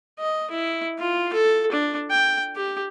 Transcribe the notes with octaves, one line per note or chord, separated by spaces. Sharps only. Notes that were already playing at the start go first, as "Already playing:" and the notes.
D#5
E4
F4
A4
D4
G5
G4